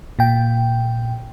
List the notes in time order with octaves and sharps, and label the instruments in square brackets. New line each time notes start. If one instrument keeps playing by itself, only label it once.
[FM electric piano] A#2 G5